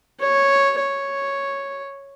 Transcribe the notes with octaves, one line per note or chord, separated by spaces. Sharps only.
C#5
C#5